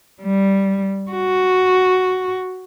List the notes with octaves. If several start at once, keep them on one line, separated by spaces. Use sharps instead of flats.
G3
F#4